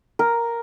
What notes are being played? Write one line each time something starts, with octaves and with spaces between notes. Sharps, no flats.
A#4